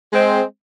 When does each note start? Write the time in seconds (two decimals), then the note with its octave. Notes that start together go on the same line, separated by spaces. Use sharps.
0.13 G#3 C4